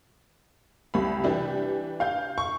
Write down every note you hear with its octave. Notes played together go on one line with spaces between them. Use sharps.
C2 G3 B5
E3 D4 G4
F5 G6
C#6